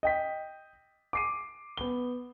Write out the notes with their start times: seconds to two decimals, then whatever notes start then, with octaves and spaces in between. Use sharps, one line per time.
0.03 D#5 G5 B6
1.13 D6 C7 D#7
1.77 B3 G7